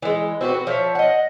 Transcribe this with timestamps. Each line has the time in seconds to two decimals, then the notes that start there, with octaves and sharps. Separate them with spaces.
0.02 E3 G#3
0.41 C4 F#4 G4 B4
0.54 F#4
0.67 F3 C#5 E5
0.95 D#5 F#5